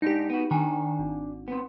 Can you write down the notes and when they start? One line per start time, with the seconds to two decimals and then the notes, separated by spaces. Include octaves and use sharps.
0.02 G#2 D4 D#4 G4
0.30 B3 F#4
0.51 D#3 D4 G#5
0.99 G#1
1.48 B3 C4